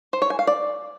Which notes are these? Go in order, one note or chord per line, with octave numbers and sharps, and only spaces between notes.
C5
C#5
G#5
F5
D5